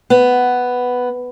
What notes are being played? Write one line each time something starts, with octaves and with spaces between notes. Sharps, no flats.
B3